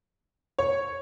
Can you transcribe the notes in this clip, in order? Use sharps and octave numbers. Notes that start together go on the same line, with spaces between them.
C#5